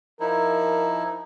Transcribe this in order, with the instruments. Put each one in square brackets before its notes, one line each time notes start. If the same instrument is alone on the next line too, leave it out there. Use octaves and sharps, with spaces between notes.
[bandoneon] F3 D#4 E4 [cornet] A#4